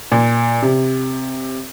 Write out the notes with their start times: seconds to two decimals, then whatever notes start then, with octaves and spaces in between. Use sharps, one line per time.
0.12 A#2
0.62 C3